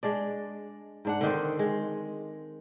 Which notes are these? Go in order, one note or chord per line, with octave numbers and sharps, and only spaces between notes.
G#3 D4 D5
G#2 D4 F#5
D3 D#3 C4
G#3